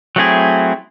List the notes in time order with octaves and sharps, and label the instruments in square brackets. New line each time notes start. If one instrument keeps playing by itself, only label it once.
[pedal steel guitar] F#3 A3 C4 E4 G#4